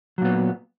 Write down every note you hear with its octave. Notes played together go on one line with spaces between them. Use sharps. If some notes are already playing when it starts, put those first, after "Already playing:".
A#2 F#3 B3